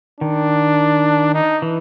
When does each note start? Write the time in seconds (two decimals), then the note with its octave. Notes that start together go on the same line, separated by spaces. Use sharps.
0.21 D#3 D4
1.34 D#4
1.62 E3